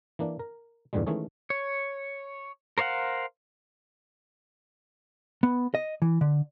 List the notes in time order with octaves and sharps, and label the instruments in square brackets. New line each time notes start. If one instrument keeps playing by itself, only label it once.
[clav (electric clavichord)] E3 A#3 D4
A#4
E2 G2 A#2 D3 G3 G#3
D#3 E3 G#3 A3 C#4 G#4
[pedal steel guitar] C#5
A#4 C5 C#5 F5 F#5
[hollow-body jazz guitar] B3
D#5
E3
D3